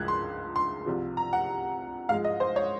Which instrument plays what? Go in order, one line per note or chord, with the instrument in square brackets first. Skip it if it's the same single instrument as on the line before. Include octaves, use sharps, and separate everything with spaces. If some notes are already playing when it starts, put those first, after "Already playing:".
Already playing: [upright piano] C#2 F3 G#3 F#6 G#6
C6
C6
C2 C3 F3
A#5
F#5
G#2 F3 G#3 F5
D#5
C5
C#5